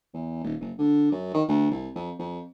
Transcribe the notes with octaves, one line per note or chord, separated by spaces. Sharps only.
E2
D#1
F#1
D3
F#2
D#3
D2
C2
F2
F2